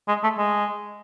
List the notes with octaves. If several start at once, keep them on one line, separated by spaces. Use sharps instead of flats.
G#3
A3
G#3